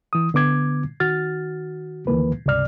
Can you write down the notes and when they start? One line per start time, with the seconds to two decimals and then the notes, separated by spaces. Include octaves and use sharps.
0.13 E3 D#6
0.34 D3 B3 D6 G#6
1.00 D#3 F#4 F6 A6
2.07 D2 D#3 E3 A#3 B4
2.46 C#2 G2 C3 D5 F6